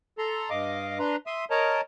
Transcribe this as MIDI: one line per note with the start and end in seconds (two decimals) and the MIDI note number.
0.18 0.50 69
0.18 0.50 82
0.18 0.50 84
0.50 0.99 43
0.50 0.99 75
0.50 0.99 77
0.50 0.99 86
0.99 1.16 62
0.99 1.16 71
0.99 1.16 82
0.99 1.16 84
1.27 1.45 76
1.27 1.45 84
1.27 1.45 87
1.51 1.81 70
1.51 1.81 73
1.51 1.81 75
1.51 1.81 81
1.51 1.81 82